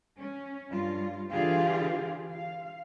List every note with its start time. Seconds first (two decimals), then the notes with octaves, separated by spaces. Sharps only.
0.17 C#4
0.71 G2 F4
1.30 D3 E3 F4 G4 G#4 F5
2.34 F5